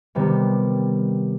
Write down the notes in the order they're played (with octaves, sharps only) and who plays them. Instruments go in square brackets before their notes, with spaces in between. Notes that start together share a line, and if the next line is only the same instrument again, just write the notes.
[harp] C3 D#3 G3 B3